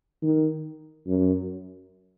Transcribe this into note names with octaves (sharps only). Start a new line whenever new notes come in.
D#3
F#2